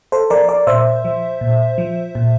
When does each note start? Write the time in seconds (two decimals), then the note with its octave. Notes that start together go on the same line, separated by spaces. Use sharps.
0.12 A4 C5
0.30 F3 A#4 D5
0.49 A#4 D5
0.67 A#2 C5 E5
1.05 F3
1.41 A#2
1.78 F3
2.15 A#2